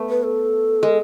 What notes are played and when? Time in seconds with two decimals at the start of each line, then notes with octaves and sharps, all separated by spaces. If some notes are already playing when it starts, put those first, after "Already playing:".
Already playing: A3 B3
0.09 B4
0.23 A4
0.83 G#3